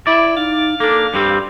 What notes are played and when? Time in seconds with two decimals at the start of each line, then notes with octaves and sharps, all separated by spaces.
0.07 E4 D5
0.36 D#4 F5
0.80 A#3 D4 A4
1.14 G2 G3 C4 G4